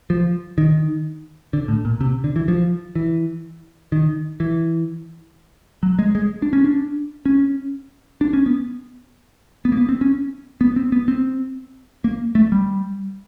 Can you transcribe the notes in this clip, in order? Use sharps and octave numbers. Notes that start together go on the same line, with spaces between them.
F3
D#3
D3
A2
A#2
C3
D3
E3
F3
E3
D#3
E3
F#3
G#3
G#3
D4
C#4
D4
C#4
D4
C#4
B3
B3
A#3
B3
C4
C#4
B3
C4
B3
C4
A#3
A3
G3